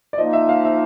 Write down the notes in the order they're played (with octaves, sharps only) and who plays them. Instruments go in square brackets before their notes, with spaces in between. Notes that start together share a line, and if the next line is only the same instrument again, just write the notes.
[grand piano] D5
[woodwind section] F3 A#3 D#4 [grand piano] D#5
[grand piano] E5
F5
E5